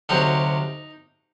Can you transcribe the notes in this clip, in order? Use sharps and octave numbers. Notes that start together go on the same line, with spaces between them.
D2 C3 F#3 C4 D#4